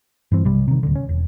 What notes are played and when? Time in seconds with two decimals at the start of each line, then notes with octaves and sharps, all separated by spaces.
0.32 G2 E3 C4
0.45 B1 C3 G3
0.68 C3 D#3
0.83 D1 D3
0.95 C#4
1.09 E1